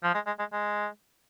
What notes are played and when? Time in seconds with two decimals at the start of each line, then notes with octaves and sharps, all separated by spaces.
0.03 F3
0.14 G#3
0.26 G#3
0.39 G#3
0.52 G#3